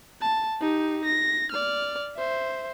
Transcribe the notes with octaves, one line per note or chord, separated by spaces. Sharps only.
A5
D#4 G4
A#6
D5 F6
C5 E5